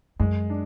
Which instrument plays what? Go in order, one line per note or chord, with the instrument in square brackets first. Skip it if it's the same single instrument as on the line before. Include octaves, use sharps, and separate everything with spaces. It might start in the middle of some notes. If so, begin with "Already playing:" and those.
[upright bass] F#2 [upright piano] G#3
[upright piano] D4